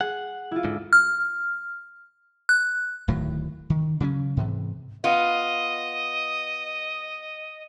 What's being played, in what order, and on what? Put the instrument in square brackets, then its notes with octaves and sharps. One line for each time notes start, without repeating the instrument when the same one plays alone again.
[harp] G#4 [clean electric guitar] F#5
[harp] E4 F4
[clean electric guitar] G#2 D3
[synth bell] F6
F#6
[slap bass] D1 A2 D#3 F#3
D#3
C#3 F#3 A#3 C#4
G#2 C3 E3
[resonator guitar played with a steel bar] B3 F4 [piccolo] D#5